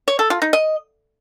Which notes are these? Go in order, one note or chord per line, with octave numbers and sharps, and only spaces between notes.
C#5
A4
F4
D#4
D#5